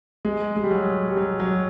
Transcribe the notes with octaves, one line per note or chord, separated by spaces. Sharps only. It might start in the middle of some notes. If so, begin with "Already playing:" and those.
G#3
G#3
G3
F#3
G3
F#3
F#3